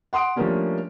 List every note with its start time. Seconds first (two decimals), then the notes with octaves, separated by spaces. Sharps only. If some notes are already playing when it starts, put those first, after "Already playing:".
0.13 F#5 C6 D#6 D7
0.36 F3 G3 A3 A#3 C#4 D4